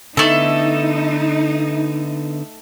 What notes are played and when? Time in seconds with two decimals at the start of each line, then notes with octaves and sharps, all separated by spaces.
0.17 D3 A3 B3 D#4 E4 A4